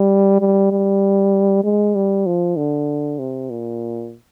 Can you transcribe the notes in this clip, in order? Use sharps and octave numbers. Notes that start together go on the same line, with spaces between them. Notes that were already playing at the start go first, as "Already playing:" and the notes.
Already playing: G3
G3
G3
G#3
G3
F3
D3
C3
A#2